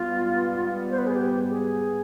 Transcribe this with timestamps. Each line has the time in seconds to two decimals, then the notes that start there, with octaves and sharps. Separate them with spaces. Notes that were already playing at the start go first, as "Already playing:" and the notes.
Already playing: G#2 G3 B3 F4
0.91 C5
0.98 B4
1.07 G#4
1.16 G4
1.50 G#4